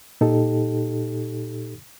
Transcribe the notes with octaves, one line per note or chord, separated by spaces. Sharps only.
A#2 D#4 G4 A4